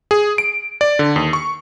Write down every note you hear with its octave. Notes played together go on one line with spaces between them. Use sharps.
G#4
D7
D5
D3
D#2
C#6